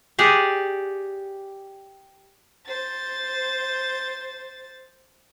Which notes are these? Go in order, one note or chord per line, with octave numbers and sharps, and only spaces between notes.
G4 G#4 D5 F#5
C5 A6